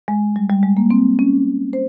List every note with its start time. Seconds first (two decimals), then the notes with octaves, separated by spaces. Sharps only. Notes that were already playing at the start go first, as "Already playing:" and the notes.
0.08 G#3
0.36 G3
0.50 G3
0.63 G#3
0.77 A#3
0.91 C4
1.19 C#4
1.73 C5